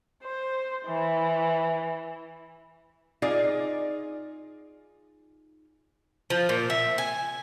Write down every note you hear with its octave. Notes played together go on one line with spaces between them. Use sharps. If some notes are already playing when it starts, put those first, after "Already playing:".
C5
E3
D#4 F4 G#4 D5
F3
A#2
E5
G#5